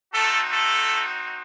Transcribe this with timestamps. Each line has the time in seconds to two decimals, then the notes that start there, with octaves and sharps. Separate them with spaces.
0.13 A3 C4 D#4 F#4 A4
0.51 A3 A4